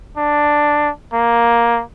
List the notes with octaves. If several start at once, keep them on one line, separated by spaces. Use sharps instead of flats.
D4
A#3